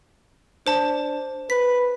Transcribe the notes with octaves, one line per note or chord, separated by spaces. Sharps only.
D4 C5 A5
B4 B6